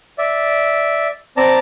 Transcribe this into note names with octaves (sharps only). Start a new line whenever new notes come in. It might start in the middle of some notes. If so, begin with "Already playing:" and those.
D5 E5
C4 D5 A5 A#5